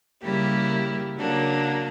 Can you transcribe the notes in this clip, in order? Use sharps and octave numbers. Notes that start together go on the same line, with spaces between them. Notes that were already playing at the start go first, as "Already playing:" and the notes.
C#3 G3 A#3 E4 G4
C#3 F#3 A#3 D4